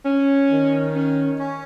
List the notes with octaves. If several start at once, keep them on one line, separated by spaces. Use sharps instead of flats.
C#4
D#3
C#4
C#4